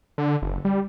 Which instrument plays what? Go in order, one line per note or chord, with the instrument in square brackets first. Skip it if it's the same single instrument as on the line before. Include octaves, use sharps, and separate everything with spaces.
[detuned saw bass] D3
F#1
G3